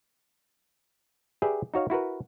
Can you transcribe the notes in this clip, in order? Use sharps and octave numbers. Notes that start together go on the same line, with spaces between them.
G4 G#4 B4 D5 E5 G5
D#4 F#4 C#5 F5
E4 F#4 A#4 B4